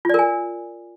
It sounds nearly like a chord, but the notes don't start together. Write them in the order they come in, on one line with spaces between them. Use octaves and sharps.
F4 D5 A#4 G#5